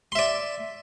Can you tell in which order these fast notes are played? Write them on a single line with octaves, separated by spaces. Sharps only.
C6 E5 D5